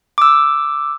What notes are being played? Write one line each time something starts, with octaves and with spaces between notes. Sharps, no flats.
D6 E6